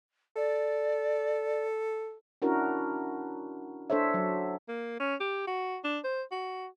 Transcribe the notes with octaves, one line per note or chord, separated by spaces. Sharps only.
A4 D5
C#4 D4 E4 F#4 A#4
D4 A4 C5 C#5 E5
F#3
A#3
C#4
G4
F#4
D4
C5
F#4